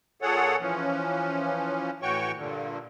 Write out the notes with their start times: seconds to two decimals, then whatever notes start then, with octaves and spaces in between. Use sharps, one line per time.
0.22 A#2 G#4 A4 C#5 F#5
0.61 E3 F3 C#4
2.02 A2 E3 F#4 C#5 G5 C#6
2.37 G2 A#2 D3